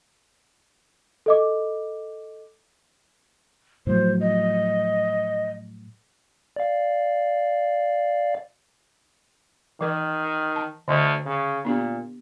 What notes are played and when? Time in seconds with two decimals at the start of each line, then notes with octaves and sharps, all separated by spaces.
1.26 A4 D#5 D6
3.87 A2 F3 F#3 C5
4.20 D#5
6.56 D5 F5
9.81 D#3 E3 A#4
10.56 A5
10.88 D2 D3 D#5 C6
11.25 C#3
11.65 A#2 B3 D4 G4